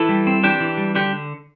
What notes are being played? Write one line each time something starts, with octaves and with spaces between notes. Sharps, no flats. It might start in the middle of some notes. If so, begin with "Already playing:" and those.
Already playing: E3 E4 A4
G3
C4
E3 D4 G4
E3
G3
D3 D4 G4